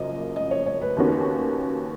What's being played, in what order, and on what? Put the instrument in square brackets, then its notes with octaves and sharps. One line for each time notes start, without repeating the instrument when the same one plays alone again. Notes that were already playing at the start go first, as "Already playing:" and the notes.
Already playing: [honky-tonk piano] F#2 C#3 F3 A#3 [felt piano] D#5
[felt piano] D#5
C#5
C#5
B4
[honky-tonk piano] D#2 D#3 A#3 C#4 F#4